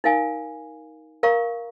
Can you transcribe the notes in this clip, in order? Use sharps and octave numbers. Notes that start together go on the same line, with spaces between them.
D#4 A#4 F5 G#5
A#4 F5 A#5 C#6